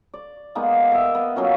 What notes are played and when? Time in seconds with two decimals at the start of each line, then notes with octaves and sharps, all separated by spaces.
0.14 D5
0.55 G#3 A#3 B3 D#4
0.91 A#4 D#5 E5
1.15 B3
1.36 F#3 A#3 C#4 F4